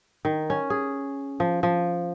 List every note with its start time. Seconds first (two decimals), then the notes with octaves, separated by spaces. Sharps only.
0.25 D#3
0.50 C#4
0.70 G#4
1.40 F3
1.63 F3